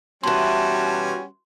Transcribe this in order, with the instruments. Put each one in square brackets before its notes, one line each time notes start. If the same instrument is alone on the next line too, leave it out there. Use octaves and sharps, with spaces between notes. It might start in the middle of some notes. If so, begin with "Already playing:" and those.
[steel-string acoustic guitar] B2 E3 [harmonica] G3 C#4 F#4 [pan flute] A5 [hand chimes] C6